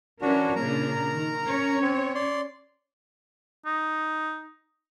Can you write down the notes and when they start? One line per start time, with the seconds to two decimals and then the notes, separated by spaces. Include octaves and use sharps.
0.22 E3 C#4 D4 F#4 A#4
0.55 A#2 C#3 D4 A#4 A#5
1.11 D#3
1.46 C#4 C#5
1.82 C4
2.15 D5 C6
3.66 D#4